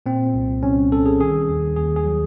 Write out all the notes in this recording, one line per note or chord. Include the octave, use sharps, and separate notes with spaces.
A#2 C4
C2
C2 C#4
G3 A4
G#4
D#3 G#4
D#2
D#2 G#4
G#4
F#3